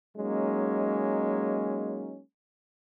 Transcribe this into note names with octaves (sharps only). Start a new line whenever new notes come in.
F#3 G#3 A#3 C#4 D#4